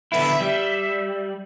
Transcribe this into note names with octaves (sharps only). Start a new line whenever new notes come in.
D3 B3 E4 E5
G3